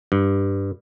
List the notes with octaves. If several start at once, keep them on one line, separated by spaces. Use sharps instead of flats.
G2